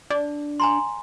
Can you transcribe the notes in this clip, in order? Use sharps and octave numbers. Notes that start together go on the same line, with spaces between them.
D4 D5
G#5 A#5 C6